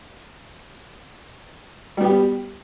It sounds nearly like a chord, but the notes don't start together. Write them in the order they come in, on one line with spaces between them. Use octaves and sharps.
G3 B3 G4